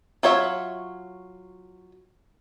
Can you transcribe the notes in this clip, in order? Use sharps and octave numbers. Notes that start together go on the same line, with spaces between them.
F#3 F4 C#5 E5